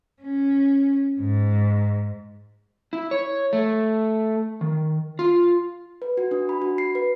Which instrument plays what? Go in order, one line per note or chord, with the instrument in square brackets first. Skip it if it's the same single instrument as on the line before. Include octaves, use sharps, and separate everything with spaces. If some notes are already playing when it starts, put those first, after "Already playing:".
[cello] C#4
G#2
[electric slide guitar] E4
C#5
A3
D#3
F4
[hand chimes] B4
F#4
D4
B5
F#4
C7
B4